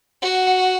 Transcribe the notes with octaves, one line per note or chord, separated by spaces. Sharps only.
F#4 F#5
F#5